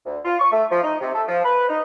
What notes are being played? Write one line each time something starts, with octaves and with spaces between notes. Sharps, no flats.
D2
F4
C#6
A3
F3
D#4
C3
A3
F3
B4
D#4